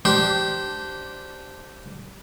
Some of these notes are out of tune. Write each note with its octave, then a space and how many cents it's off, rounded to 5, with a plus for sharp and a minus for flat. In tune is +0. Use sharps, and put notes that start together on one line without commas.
D4 +0 G4 -15 C5 +0